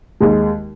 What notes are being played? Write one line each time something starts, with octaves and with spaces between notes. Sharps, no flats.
D#2 D#3 G#3